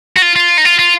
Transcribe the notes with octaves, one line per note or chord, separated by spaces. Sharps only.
F#4
F4
F4
D#4
F4
F4